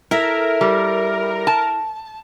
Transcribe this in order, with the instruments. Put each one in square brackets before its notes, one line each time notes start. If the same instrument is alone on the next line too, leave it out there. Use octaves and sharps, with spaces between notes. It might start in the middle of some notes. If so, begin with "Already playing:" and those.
[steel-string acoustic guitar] E4 A4 E5 [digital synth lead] A#4
[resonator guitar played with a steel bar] G3
A5